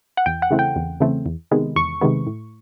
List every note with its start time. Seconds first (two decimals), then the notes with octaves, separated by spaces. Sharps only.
0.17 F#5
0.26 E2 G5
0.42 F#5
0.50 C#3 E3 A3 C4
0.59 G5
0.76 E2
1.00 C#3 E3 A3 C4
1.26 E2
1.51 C3 D#3 G#3 B3
1.76 E2 C#6
2.01 C3 D#3 G#3 B3
2.27 A2